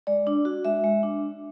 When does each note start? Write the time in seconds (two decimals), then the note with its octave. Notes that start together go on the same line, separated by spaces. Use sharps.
0.07 G#3 D5
0.27 D4
0.45 F#4
0.65 G#3 E5
0.84 G#3
1.03 D4